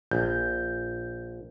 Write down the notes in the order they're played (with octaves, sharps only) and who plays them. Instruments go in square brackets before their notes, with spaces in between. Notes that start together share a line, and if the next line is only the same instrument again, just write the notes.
[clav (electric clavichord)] A#1 [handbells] G6